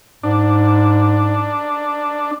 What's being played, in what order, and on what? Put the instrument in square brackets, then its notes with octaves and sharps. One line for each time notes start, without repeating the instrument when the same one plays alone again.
[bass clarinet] G#2 [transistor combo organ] D4